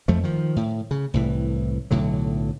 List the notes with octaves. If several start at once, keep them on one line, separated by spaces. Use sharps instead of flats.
F2 F3 A3
D#3 F3
A2
C#3
C2 A2 E3
B1 A2 D3 F#3